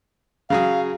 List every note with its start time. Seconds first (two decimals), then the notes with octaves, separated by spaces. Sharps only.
0.50 C#3 F#3 G#4 F5